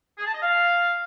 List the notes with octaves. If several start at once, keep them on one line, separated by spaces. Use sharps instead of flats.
G#4
A5
D#5
F5